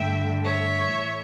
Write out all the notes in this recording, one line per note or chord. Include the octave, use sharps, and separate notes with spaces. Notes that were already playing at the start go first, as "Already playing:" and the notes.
Already playing: G2 D3 A3 E5 G5
C#5 E5
A2 E3 A3